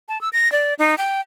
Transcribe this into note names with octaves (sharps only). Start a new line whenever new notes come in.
A5
E6
A#6
D5
D#4
G5